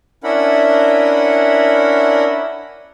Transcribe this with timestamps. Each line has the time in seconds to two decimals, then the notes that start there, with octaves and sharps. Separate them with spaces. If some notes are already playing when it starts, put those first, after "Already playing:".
0.24 C#4 D4 E4 A#4 F#5 B5